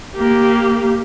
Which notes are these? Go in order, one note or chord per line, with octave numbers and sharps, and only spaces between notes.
A#3 G4